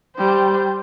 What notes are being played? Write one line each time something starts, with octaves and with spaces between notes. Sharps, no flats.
G3 C5